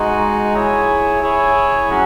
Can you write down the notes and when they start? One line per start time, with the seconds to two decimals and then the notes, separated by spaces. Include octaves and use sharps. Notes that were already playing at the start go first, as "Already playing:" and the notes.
Already playing: G#3 D#4 F#4
0.54 E4 G#4 C#5
1.22 E4 G#4 C#5
1.90 F#3 C#4 F#4